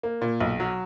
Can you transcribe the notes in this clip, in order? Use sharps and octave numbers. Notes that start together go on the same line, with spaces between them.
A#3
A#2
B1
F#3